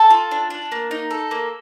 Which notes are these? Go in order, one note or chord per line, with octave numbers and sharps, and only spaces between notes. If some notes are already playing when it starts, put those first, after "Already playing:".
Already playing: A4 A5
F4
D4
D4
A#3
D#4
A4
A#3